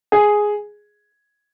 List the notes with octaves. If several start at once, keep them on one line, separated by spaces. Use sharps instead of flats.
G#4